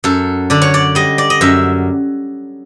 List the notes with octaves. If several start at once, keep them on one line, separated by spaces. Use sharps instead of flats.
F#2 A4
D3 D5
C#5
D5
G3 D#5
D5
D#5
F#2 E5